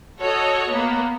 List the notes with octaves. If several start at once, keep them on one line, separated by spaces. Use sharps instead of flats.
F#4 A4 C#5 D#5
A#3 B3